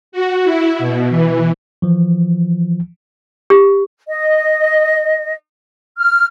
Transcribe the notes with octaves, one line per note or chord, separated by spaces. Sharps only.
F#4
E4
B2
E3
E3 F3
G4
D#5
F6